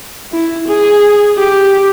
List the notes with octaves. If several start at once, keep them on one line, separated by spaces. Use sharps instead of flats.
E4
G#4
G4